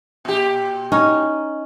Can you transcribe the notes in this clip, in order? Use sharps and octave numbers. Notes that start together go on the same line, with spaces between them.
A#2 G4
C#4 D#4